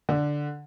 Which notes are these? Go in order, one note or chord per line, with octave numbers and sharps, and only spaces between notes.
D3